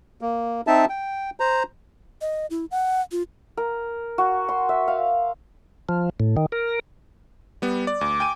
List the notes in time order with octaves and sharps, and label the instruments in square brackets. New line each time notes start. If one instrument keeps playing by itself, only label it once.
[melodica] A#3
C4 D#4 E5 A5
G5
C5 A#5
[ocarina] D#5
E4
F#5
F4
[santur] A#4
F#4
C6
E5
F5
[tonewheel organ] F3
A2
D#3
A#4
[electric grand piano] G3 B3
D5
[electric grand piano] D2 [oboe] D6
[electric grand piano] G5 G#5 D#7